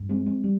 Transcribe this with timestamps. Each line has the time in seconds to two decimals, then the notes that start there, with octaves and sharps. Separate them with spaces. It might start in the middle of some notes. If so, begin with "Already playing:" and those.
Already playing: G2
0.09 G#3 C4
0.26 G#3 C4
0.44 G3